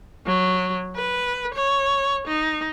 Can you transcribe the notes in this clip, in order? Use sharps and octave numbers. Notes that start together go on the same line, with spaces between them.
F#3
B4
C#5
D#4